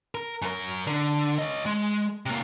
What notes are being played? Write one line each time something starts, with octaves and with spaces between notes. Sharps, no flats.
A#4
F#2 A#4
D3
C#5 D#5
G#3
C3 A#3